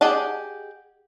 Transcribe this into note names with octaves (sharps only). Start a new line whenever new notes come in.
G4 G#4 D#5 F#5 A5